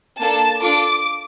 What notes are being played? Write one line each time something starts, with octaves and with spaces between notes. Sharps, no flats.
A#3 D4 A4 A5
D4 F4 A4 D6